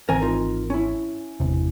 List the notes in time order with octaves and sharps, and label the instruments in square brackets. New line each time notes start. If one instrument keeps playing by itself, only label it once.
[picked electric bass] G#1 E3 C4 [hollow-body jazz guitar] A#4 C5 G#5
[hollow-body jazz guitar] D#4 F4 A#4
C#4 E4
[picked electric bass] G1 E2 C3